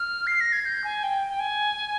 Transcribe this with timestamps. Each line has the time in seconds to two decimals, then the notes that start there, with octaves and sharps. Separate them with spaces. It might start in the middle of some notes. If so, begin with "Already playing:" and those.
Already playing: F6
0.27 C7
0.41 A#6
0.53 G#6
0.66 G6
0.84 G#5
1.03 G5
1.28 G5
1.40 G#5